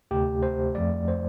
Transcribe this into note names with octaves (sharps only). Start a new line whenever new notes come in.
D2 C3 A3 G4
C5
F2 F3 A3 D5
C5